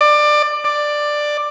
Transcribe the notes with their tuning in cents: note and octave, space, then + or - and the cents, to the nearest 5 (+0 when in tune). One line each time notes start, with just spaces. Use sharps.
D5 +20
D5 +10